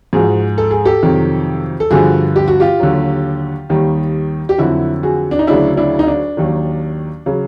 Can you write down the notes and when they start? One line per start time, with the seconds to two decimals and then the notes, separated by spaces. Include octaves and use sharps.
0.13 G#2 F3 F#4 G#4
0.58 A4
0.71 G#4
0.85 G4 A4
1.03 F2 C3 D#3 F#3
1.80 A4
1.91 G2 D3 F3 F#4 G#4
2.36 G4
2.48 F#4
2.60 F4 G4
2.80 D#2 D3 F#3
3.70 D#2 D#3 G3
4.49 G4
4.58 F2 D3 F#3 E4 F#4
5.03 F#4 G#4
5.31 D4
5.39 D#4
5.47 D2 C#3 F#3 D4 E4
5.77 D4 E4
5.99 D#4
6.07 D4
6.37 D#2 D#3 F#3
7.26 C#3 F#3